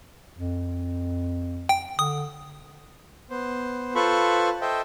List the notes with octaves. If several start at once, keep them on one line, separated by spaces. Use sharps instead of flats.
F2
G5
D3 D#6
B3 C5
F4 A4 B4 C5 B5 C#6
A4 C5 D#5 E5 G5